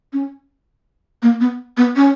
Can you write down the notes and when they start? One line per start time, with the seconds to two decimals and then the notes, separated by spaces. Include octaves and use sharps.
0.13 C#4
1.23 A#3
1.40 B3
1.77 B3
1.96 C#4